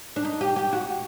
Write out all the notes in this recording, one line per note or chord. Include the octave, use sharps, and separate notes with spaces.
D4
D#4
G4
G4
F#4